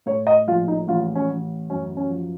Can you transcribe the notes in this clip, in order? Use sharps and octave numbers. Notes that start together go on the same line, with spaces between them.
A2 C#5
D#5
A#1 F4
D#4
A1 F4
C#4
A1
F#2 C#4
C#4
F3